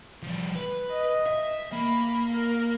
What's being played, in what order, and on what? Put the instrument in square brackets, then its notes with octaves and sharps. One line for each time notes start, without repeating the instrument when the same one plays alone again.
[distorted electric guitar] F3 G3
B4
[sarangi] D#5
[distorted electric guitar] E5
[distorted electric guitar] A#3 [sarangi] B5
[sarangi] A#4